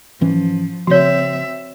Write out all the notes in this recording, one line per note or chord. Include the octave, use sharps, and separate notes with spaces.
G#2 E3 F3 C#4
C#3 F3 C4 F#4 C#5 E5